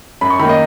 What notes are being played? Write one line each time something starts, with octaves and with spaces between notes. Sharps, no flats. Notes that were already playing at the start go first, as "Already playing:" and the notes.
F#2 B5
C#6
D#3 B5
A#3
D#5